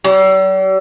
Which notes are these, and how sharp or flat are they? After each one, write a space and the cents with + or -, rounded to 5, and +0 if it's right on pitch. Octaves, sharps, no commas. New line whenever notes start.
G3 -45